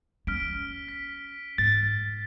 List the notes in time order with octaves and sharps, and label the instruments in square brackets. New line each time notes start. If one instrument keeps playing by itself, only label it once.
[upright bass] C#4 [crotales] F6 B6 D7
[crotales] B6
[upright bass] G#2 [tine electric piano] A6